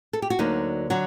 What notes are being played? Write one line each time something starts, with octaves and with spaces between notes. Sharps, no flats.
A4
G4
F#4
D2 D3 F#3 A#3 D#4
D3 F#3 F#4